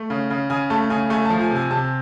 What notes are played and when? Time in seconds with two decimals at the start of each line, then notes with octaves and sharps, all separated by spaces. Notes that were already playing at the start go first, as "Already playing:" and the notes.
Already playing: A3
0.10 C#3
0.30 C#3
0.50 C#3 G#5
0.70 A3 A5
0.90 C#3 G#5
1.10 A3 G#5
1.25 A5
1.30 F3
1.41 G#5
1.51 C3
1.56 G#5
1.71 C3 A5